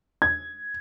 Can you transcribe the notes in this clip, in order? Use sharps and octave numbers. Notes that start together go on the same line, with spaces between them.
G#6